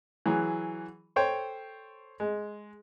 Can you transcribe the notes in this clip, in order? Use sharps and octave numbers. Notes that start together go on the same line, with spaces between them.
E3 F#3 G#4
A4 C5 C#5 G5
G#3